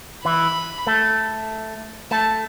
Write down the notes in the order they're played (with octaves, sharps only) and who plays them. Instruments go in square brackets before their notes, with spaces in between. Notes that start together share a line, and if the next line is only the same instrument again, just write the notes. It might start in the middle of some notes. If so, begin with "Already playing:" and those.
[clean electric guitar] E3 E4 [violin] B5
[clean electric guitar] A3 A4
[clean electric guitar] A3 A4 [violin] A5